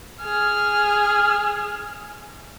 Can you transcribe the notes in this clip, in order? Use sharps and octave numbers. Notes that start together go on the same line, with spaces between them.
G#4 F6